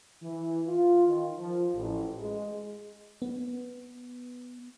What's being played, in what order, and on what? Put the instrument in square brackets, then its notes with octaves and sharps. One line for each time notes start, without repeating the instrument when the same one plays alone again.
[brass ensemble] E3
F4
D#3
F3
A1
G#3
[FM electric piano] B3